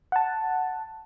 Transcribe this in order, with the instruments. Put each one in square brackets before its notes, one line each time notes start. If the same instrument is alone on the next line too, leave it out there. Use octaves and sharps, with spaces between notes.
[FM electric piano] F#5 A5